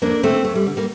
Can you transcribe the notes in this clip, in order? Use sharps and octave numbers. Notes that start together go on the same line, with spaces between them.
F2 A#3 D4
D3 A3 C4
F2 A3
G3
D3
G3 A#3